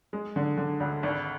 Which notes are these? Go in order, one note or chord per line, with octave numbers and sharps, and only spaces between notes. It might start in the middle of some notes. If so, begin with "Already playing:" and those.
G#3
D3
D3
D2
G#1